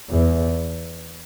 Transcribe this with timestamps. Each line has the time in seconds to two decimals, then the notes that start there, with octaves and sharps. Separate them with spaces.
0.10 E2